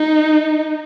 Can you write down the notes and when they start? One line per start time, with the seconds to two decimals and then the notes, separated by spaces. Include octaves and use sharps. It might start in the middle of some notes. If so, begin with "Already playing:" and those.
Already playing: D#4